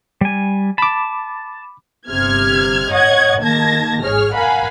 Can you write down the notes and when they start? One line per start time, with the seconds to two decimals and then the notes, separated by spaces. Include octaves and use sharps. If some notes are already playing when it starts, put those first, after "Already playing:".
0.21 G3 G#5
0.78 A5 B5 D6
2.08 G1 C3 F6 G#6
2.91 C#5 D#5 F#5 G#6
3.41 D#3 A#3 A5 G#6 A#6
4.02 G#1 G#4 C#5 F6
4.34 A#4 F5 F#5 G#5 B5